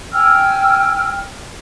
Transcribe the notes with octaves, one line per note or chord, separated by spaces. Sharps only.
G5 G#5 E6 F6